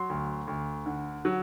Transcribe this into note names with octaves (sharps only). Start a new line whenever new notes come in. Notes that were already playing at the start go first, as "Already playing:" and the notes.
Already playing: F#3 C6
D2
D2
D3
F#3